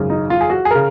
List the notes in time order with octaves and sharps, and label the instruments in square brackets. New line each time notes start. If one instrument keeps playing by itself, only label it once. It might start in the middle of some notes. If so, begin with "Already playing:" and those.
Already playing: [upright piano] G#1 F#2 C#3
D#4
F4
G#4
F#4
G#4
C#3 A#4